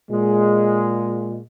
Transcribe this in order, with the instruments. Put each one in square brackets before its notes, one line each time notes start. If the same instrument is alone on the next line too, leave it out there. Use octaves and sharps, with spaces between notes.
[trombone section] A#2 G#3